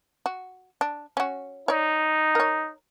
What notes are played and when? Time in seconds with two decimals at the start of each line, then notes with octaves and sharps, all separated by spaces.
0.26 F#4
0.81 D4
1.17 C#4 F#4
1.68 D#4 C#5 D5
2.35 A#4 C#5